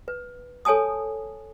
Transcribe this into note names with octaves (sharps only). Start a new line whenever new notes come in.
B4
A4 C#5 G#5 A5 D#6